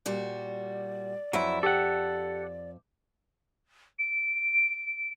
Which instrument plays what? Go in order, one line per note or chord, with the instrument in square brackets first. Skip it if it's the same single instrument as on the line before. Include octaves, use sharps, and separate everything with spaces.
[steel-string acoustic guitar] A#2 G3 F#4 [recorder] D5
[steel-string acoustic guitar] F2 E5 [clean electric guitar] F#3 E4
[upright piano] G4 [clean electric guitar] A4 F#5
[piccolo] D7